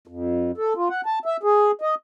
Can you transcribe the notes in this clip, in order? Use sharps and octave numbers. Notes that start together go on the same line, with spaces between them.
F2
A4
F4
F#5
A5
E5
G#4
D#5